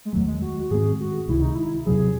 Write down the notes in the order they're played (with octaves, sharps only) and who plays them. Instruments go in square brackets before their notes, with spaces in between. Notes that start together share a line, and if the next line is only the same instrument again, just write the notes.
[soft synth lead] G#3
[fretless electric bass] E2 D#3 A3 [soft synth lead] F#3
[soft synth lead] G#3
F#4
F#4
[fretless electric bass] G#2 D#3 G#3 C4 [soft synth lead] G#4
[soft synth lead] F#4
[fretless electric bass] C#2 C3 D#3 G#3 [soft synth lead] E4
[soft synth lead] D#4
E4
[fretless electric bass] E2 C3 F#3 [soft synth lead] G#4